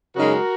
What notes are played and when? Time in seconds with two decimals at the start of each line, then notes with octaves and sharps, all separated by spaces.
0.16 F#2 C#3 G#3 D#4 F#4 A#4